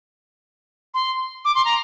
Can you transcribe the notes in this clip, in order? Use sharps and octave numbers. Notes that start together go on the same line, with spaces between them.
C6
D6
C6
A#5